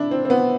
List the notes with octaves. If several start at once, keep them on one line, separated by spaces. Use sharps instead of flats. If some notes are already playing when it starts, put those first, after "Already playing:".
Already playing: D4 E4
C4
C4
B3